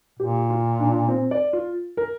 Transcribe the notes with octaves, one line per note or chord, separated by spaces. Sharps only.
A#2 G4
F4
D4
C4
D5
F4
A#4